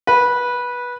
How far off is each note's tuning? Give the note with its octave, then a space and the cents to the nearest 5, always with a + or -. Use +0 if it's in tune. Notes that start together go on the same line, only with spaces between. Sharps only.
B4 -15